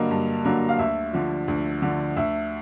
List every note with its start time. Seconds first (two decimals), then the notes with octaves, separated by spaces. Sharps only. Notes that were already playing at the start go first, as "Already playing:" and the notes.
Already playing: G2 D3 F#3 A#3 D#5
0.11 G2
0.45 D3 F#3 A#3
0.69 F5
0.79 D2 E5
1.13 D3 F3
1.48 D2
1.82 D3 F3
2.16 D2 E5